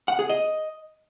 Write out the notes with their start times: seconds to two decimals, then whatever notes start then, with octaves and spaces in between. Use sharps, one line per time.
0.08 F#5
0.19 G#4
0.29 D#5